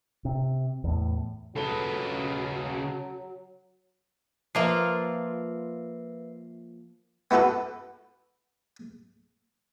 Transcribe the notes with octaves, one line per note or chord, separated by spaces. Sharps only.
C3
E2 A2
C#3 F#3 A4 B4 G7
F3 A#3 F4 B4 E5 C7
B3 E4 F#4 A4 B4